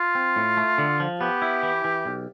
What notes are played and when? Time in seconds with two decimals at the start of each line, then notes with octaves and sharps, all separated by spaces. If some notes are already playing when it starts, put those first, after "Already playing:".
Already playing: F4
0.15 C4
0.36 A2
0.57 A3
0.78 D3
1.00 F3
1.21 B3 G4
1.42 E4
1.63 E3
1.84 E3
2.06 B1